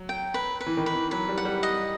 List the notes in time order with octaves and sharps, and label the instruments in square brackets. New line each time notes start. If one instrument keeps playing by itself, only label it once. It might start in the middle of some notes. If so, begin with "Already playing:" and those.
Already playing: [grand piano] F#3
[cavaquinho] G5
B4
B4
[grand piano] E3
D#3
[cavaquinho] B4
[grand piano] E3
[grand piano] F#3 [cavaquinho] B4
[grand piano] G3
[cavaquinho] F#5
[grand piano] G3
[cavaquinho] D#5